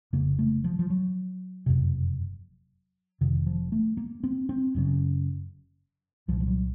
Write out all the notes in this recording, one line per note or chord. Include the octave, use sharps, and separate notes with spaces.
F1 F2 C#3 A#3
A3
F3
F3
F#3
F#1 F2 C3
F1 F2 C3 D#3
F3
A3
A#3
C4
C4
F#1 F#2 C#3
C2 A#2 F3
F3
F#3